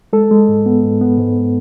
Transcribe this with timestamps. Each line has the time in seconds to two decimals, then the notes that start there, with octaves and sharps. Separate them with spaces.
0.13 G#3 A4
0.31 G#3
0.49 G#2
0.66 B3
0.83 G#2
1.01 B3
1.18 G#2